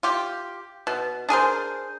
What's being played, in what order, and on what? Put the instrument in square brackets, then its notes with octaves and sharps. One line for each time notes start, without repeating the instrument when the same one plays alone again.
[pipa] F4 G4
B2
D4 G#4 A#4 C5